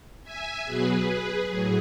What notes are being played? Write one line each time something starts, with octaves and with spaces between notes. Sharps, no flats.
E5 G#5
B2 F#3 G#4 B4
A2 F#3 G#4